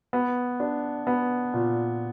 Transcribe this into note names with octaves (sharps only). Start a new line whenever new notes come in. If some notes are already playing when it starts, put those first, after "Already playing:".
B3
D4
B3
A#2